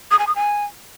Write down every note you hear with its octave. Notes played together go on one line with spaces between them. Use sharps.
D#6
G#5
D#6
G#5